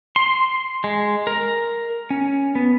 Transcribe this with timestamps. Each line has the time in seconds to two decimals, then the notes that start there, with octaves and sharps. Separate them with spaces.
0.16 C6
0.84 G#3
1.27 A#4
2.10 C#4
2.55 B3